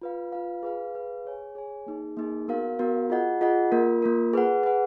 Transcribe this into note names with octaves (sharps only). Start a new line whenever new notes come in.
F4 B4 F5
F4 B4 F5
G#4 B4 F5
G#4 B4 F5
G#4 C#5 G#5
G#4 C#5 G#5
A#3 D#4 G#4
A#3 D#4 G#4
B3 F#4 A#4 F5
B3 F#4 A#4 F5
F4 G#4 D#5 F#5
F4 G#4 D#5 F#5
A#3 F4 A#4
A#3 F4 A#4
G#4 B4 F#5
G#4 B4 F#5